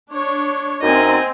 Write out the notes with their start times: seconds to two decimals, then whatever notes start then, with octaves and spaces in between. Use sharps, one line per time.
0.11 D4 C#5
0.82 F#2 C4 D#4 D#5 G#5